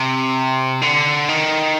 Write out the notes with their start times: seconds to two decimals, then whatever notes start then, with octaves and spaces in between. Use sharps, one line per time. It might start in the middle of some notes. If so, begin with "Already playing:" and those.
Already playing: C3
0.82 D3
1.29 D#3